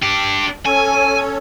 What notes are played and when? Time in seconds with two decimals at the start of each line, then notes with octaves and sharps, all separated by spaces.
0.02 D4 G4
0.65 C#4 A4 C#5 G#5